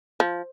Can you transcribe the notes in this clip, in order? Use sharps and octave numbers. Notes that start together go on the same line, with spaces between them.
F3